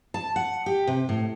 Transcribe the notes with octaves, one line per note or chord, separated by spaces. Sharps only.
A5
F#5
G4
C3
A2